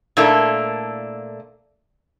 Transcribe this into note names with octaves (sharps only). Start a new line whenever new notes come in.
A#2 A3 A#3 D4 E4 A4